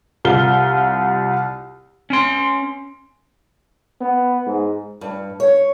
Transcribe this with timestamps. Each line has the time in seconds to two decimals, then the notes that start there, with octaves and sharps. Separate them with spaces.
0.25 C2 F4 G7
2.10 C#4 C6
4.01 B3
4.47 G#2
5.01 G2
5.40 C#5